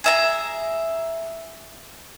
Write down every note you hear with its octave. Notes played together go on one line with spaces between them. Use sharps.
G#4 E5 A#5